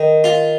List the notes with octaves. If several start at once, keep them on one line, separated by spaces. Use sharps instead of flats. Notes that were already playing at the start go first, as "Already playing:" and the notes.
Already playing: D#3
F4